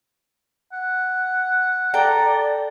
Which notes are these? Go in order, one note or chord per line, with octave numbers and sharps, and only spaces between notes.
F#5
A4 D5 G5 A#5